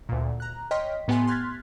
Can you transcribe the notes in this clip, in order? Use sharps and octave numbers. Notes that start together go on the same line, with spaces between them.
D2 A#2
A#5 F#6
C#5 D#5 G5 C6 F6 B6
A2 B3 G4 G#5 C6
C6 F6 F#6 G#6 A6 B6